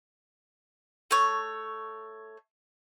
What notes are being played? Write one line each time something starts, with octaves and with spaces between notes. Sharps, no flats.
A3 C#5